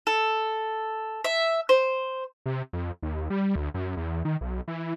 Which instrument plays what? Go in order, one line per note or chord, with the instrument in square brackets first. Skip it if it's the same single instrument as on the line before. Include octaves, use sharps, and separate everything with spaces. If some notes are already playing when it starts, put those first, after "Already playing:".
[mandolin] A4
E5
C5
[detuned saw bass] C3
F2
D#2
G3
D2
F#2
E2
D#3
B1
E3